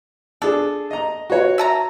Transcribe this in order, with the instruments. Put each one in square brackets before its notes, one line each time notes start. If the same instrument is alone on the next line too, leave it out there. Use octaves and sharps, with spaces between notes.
[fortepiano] D4 G#4 [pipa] A4
[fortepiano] D#5 A#5
F#4 C#5
[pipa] E5 A5 A#5